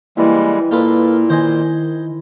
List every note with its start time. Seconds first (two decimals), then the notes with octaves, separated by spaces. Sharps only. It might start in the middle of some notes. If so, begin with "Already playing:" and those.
0.17 E3 G3 G#3 A#3 E4
0.71 A#2 A#3 F4 A4 B4
1.30 D#3 C5 D#5 G#5